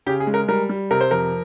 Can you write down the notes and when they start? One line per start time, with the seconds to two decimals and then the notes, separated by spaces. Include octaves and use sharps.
0.06 C#3 G4
0.20 G#4
0.27 G#3
0.34 A#4
0.48 G3 A#4
0.69 G3
0.91 C3 A#4
1.01 C5
1.11 F2 A#4